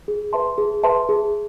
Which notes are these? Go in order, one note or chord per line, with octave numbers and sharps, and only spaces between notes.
G#4
B4 E5 A5 C6
G#4
B4 E5 A5 C6
G#4